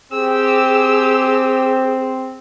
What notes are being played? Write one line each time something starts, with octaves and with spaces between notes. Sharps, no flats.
C4 G4 G#4 E6